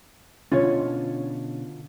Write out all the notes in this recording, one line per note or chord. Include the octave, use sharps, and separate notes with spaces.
B2 D3 C#4 F4 C#5